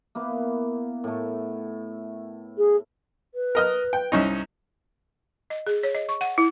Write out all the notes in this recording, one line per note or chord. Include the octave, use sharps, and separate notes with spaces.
A#3 B3 E4
A2 A3
G#4
B4
A#4 D#5 F6
G5
C2 C#4 D#4
D#5
G#4
C#5
D#5
C#6
F#5
E4